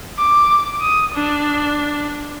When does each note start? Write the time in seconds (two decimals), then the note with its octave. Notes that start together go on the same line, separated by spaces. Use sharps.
0.18 D6
0.81 D#6
1.14 D4